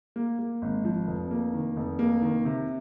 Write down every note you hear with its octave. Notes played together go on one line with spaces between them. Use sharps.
A#3
A#3
G#1
F3
F1
A#3
D#3
F1
A#3
D#3
C3